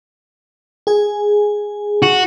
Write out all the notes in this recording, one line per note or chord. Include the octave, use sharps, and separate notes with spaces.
G#4 G#5
F#4